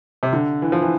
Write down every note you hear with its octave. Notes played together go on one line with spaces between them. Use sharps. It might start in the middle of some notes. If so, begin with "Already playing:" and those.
C3
D3
E3
F3
E3